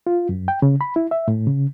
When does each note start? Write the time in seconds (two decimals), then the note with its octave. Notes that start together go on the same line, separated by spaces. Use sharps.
0.07 F4
0.29 F#2
0.48 G5
0.62 C#3
0.81 B5
0.96 E4
1.11 E5
1.28 A2
1.47 C#3